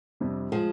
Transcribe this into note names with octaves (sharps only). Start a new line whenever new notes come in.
F2 C3 G3 D4
F3 G#3